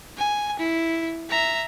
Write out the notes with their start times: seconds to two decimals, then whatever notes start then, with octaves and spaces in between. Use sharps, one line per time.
0.17 G#5
0.59 E4
1.29 E5 A#5